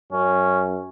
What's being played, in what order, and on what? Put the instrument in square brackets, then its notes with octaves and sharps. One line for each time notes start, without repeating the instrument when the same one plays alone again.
[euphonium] F#2 [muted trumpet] C#4